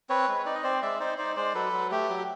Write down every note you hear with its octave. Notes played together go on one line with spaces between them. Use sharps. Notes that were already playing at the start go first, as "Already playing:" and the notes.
C4 B4 C#5
G#3
D#4 D5
D#5
C4 C5 D5
G#3 D5 E5
D#4 C5 D5
D#4 C5 D5
G#3 C5 D5
F#3 A4 B4
F#3
A3 G4
F#3